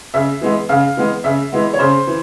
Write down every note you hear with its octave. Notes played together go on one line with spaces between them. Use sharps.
C#3 E5
E3 G#3 B3
C#3 F5
E3 G#3 B3
C#3 E5
E3 G#3 B3
C#5
C#3 C5
E3